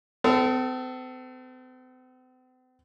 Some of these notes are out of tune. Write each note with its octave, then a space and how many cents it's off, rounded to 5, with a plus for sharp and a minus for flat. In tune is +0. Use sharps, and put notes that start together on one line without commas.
C4 -45 A4 +0